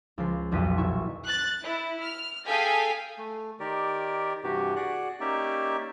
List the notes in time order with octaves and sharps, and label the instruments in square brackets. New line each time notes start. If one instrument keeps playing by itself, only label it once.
[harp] C#2 F3 C7
D#1 B1 F2 B6 D#7
D#1 E4 C#6
[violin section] F#6 A6
E4
F6
G#4 A4 F5 G5 G#5 B6
[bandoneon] A3
D#3 G4 A#4 D5
G2 C3 E3 F#4 G4
F#4 G#4 D5 F#5 F#6
A#3 C#4 D#4 G4 D5 E5